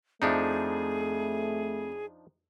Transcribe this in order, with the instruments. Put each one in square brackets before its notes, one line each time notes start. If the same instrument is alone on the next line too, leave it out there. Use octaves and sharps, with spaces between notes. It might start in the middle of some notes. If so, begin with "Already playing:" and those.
[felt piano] F2 E5 [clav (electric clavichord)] F3 D4 D#4 [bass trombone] A3 [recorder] G#4